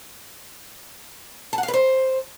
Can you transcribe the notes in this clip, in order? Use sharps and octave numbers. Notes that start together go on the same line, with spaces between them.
A5
F#5
F5
B4
C5